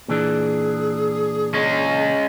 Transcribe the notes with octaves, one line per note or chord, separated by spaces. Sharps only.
A#2 E3 D4 G#4
G#3 C#4